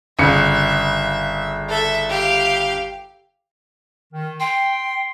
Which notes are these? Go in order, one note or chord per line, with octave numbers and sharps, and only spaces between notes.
G1 C#3 E5 C#7
A4 E5
G4 F5
D#3
G5 C6